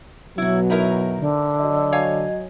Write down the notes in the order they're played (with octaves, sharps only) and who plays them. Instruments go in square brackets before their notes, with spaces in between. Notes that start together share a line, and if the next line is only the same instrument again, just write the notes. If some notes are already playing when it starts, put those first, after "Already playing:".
[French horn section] B2 F#3 [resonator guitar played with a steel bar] E4 F#4
[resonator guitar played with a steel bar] D#4 E4 A#4
[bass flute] D3
[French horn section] F#3 D#5
[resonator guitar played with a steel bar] C#5 F5 G#5